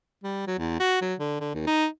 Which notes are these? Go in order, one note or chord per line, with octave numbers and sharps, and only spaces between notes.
G3
F#3
E2
F#4
F#3
D3
D3
D#2
D#4